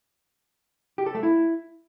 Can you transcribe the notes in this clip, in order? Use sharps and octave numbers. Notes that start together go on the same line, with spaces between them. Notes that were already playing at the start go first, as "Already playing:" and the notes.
G4
A4
A3
E4